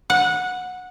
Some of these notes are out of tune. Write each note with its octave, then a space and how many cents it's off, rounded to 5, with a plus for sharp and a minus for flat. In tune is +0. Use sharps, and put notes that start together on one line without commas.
F#5 -15